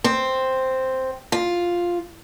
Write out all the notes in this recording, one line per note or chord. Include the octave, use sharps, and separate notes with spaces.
C4
F4